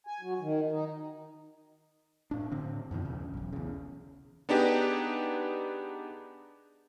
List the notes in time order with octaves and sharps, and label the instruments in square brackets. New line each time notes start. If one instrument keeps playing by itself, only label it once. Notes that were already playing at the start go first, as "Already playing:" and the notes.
[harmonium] G#5
F#3
D#3
D#4
[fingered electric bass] A2 D4
A2 D3 C4
F#2 B2 D#3 F3
D#2 C#3
E1 B1
E2 C#3
[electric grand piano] B3 D4 D#4 G4 G#4 B4